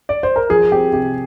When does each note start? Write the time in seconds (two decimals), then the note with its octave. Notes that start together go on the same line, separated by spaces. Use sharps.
0.09 D5
0.23 C5
0.36 A#4
0.49 F3 G#4
0.72 C4 G4
0.93 C3 G4